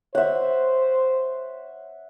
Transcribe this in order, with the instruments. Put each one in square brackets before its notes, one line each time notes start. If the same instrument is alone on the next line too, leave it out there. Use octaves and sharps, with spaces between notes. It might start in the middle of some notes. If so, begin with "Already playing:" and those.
[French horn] C5 [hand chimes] C#5 [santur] E5 F#5